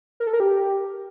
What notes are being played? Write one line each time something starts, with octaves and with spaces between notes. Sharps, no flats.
A#4
A4
A#4
G4